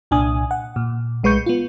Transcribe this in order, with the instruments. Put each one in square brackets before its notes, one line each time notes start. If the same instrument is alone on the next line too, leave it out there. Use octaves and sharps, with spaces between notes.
[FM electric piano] C2 A#2 D4 G#5 D#6
F#5
A#2
B1 G#3 B4 C#6 G6 C#7
B3 F4